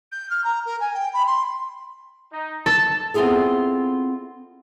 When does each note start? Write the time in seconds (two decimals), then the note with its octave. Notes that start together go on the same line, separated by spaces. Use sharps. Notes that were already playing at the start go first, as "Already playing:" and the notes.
0.12 G6
0.30 F6
0.44 A#5
0.65 A#4
0.80 G#5
0.94 G5
1.13 B5
1.27 C6
2.33 D#4
2.66 A4 A5
3.14 B3 C4 E4 F4 G#4 A4